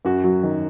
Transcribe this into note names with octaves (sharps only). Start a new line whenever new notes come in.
F#2 F#4
F#3
D#3